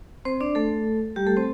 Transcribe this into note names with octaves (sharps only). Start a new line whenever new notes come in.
C4 C5
D4 D5
A3 A4
G3 G4
A3 A4
C4 C5